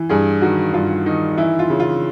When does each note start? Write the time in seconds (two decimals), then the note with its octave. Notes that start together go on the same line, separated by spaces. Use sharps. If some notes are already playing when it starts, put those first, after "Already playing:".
Already playing: E3
0.09 G2 G#4
0.41 D#3 F#4
0.73 G2 F4
1.06 D#3 D#4
1.37 E3 E4
1.59 F4
1.70 C#3
1.80 F4